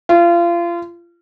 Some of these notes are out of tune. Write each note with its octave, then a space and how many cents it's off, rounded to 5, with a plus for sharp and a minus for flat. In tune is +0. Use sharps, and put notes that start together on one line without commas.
F4 -30